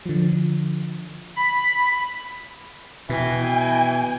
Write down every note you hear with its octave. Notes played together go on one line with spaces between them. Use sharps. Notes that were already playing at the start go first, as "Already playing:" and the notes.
D3 F3
B5
B2 E3 G5 G#5